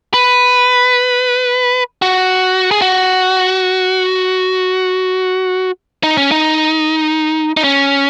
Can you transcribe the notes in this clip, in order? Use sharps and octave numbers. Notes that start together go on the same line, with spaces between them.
B4
F#4
G#4
F#4
D#4
C#4
D#4
D#4
C#4